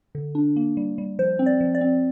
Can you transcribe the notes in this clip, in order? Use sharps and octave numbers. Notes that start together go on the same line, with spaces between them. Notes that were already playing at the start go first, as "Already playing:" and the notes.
D3
D4
A#3
G3
G3
F3 C5
C4
D5
F3
D5
C4